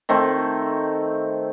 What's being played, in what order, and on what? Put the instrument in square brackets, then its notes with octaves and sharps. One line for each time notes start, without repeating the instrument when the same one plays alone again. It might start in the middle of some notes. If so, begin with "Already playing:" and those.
[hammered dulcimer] D#3 A3 C4